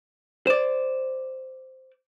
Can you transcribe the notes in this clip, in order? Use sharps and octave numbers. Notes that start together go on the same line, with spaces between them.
C5 D5